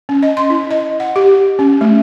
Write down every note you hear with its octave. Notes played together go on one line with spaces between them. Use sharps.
C#4
D#5
C6
E4
D#5
F#5
G4
C#4
A3